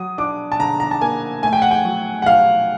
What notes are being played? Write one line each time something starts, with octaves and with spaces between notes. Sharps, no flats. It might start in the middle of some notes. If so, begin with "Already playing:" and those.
Already playing: F#3 D#6
D4 D6
A5
D3 A#5
A#5
A5
A#3 G#5
A3 G#5
G5
F#5
G5
F#3
F#5
F#3 F5